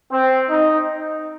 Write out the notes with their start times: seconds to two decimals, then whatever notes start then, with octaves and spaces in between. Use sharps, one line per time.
0.10 C4
0.50 D#4